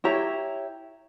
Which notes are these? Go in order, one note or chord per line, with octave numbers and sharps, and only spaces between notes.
E4 G4 C#5 A#5